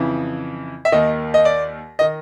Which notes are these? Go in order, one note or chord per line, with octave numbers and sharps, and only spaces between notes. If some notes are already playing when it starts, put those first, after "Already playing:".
Already playing: F2 C#3 E3
E5
D#2 D#3 D#5
D#5
D5
D#3 D#5